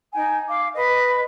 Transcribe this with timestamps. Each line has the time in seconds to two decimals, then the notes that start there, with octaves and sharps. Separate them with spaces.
0.13 D#4 G5 G#5
0.49 F5 D6
0.74 B4 D#5